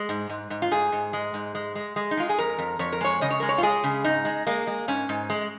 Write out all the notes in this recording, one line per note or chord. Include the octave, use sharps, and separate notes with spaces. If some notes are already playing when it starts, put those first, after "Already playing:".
Already playing: G#3
G#2
G#2
G#2
F4
G#2 G#4
G#2
G#3
G#2
G#3
G#3
G#3
D#4
G#3 F4
G#4
F2 A#4
F2
F2 C#5
A#4
G#3 C#5
C#3 D#5
C#5
G#3 A#4
C#5
F4
G#3 G#4
C#3
G#2 D#4
G#3
G#3 A#3
G#3
G#2 C#4
G#2
G#3